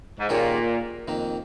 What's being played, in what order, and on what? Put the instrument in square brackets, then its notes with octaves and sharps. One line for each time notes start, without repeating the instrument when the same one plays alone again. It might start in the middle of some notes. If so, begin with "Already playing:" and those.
[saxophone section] G#2
[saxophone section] A#2 [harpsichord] D#3 G#3 C#4 G4 A#4
[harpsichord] F2 D#3 A#3